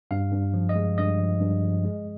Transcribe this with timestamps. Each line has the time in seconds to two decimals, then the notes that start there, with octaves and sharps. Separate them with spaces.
0.11 G2 F5
0.32 G2
0.54 F3
0.69 D#5
0.76 G#3
0.98 G2 D#5
1.19 F3
1.41 G2
1.63 F3
1.85 G#3